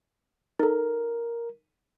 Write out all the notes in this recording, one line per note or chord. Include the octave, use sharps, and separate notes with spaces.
D#4 A4 A#4